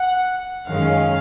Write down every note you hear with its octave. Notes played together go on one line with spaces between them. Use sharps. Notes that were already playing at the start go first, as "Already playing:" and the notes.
Already playing: F#5
F#2 D#3 G#3 C#4 F5